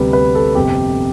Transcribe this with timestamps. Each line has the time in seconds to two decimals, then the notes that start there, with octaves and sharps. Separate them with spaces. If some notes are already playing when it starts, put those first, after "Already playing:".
Already playing: D2 C3 G3 B3 B4
0.13 B4
0.35 A4
0.55 G1 F2 C3 G4